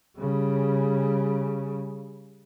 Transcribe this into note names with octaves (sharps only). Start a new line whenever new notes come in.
C#3 G3